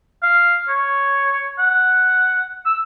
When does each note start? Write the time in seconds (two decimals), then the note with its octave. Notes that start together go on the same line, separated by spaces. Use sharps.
0.23 F5
0.68 C#5
1.59 F#5
2.66 E6